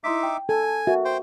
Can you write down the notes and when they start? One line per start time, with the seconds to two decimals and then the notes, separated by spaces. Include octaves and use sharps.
0.04 D#4 E4 E5 C6 D6 B6
0.23 G5
0.49 A4 G#5
0.63 A5
0.87 F#4 A#4 E5
1.05 C5 G5